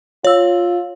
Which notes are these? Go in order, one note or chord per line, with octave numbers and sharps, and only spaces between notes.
F4 C#5 E6